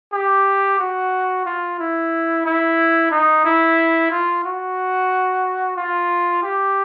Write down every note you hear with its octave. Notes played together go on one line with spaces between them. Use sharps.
G4
F#4
F4
E4
E4
D#4
E4
F4
F#4
F4
G4